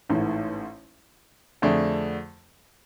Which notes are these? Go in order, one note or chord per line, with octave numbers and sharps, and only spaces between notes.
A1 G#2 E3 A3
F2 D3 A3 D4 G#4